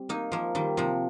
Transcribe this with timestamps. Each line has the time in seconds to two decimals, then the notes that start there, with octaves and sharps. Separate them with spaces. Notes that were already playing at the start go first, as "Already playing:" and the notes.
Already playing: G3 C4
0.09 A#3 D#4
0.32 F3 A#3
0.55 D#3 G3
0.77 C3 F3